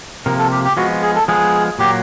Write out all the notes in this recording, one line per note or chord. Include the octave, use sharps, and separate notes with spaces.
C3 F3 A#3 A#4
A4
G4
G4
F3 G#3 B3 F#4
G#4
A4
F3 G#3 B3 G#4
A#2 F#3 A#3 G4